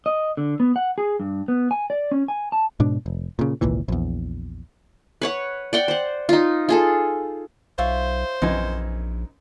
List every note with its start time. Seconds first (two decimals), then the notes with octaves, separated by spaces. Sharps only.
0.06 D#5
0.37 D3
0.60 B3
0.76 F#5
0.98 G#4
1.20 G2
1.48 B3
1.71 G#5
1.90 D5
2.11 C#4
2.28 G#5
2.52 A5
2.80 G#2 B2 D4
3.06 F1
3.39 A#2 C#3
3.61 G#1 C#2 A#2 E3
3.88 A#1 E2
5.22 B4 C#5 F#5
5.73 D5 F#5 G5
5.88 C5 F#5
6.29 D#4 F4
6.69 F4 G#4 A4
7.78 B1 F4 C5 C#5 E5
8.42 A#1 F#2 E3 C4 D#4 G#5